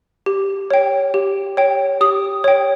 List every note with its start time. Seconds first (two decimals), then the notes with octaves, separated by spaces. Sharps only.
0.26 G4
0.71 C#5 G5
1.14 G4
1.57 C#5 G5
2.01 G4 D#6
2.44 C#5 G5